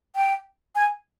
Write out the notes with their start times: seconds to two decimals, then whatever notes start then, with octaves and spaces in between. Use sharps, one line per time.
0.16 G5
0.75 G#5